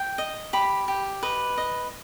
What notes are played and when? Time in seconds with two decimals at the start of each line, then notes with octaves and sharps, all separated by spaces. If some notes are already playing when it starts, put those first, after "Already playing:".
Already playing: G5
0.18 D#5
0.53 G4 B5
0.88 G4
1.23 B4 D#5
1.57 D#5